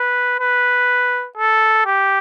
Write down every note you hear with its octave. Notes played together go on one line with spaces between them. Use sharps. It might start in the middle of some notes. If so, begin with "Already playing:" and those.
Already playing: B4
B4
A4
G4